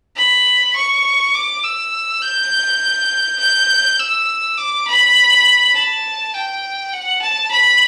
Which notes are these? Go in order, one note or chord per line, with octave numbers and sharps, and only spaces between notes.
B5
C#6
D6
E6
G6
G6
E6
D6
B5
A5
G5
F#5
A5
B5